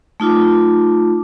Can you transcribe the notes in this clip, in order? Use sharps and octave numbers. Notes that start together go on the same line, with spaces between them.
A3 D#4 F4 D6